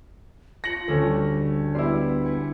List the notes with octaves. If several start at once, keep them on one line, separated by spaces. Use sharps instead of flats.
F4 A#6 C#7 F#7
D2 A3 C#4
G3
G3 B3 E4 C6
B4 G#5 C#7